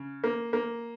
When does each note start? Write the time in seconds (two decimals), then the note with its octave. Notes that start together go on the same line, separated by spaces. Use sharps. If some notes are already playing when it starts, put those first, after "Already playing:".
Already playing: C#3
0.24 A#3
0.53 A#3